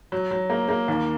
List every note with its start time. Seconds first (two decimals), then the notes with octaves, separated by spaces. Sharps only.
0.12 F#3
0.31 F#3
0.50 A#3
0.69 A#3
0.88 D#2